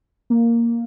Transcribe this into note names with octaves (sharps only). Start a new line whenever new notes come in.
A#3